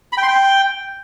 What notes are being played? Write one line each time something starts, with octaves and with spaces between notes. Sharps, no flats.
B5
G5
C6
G5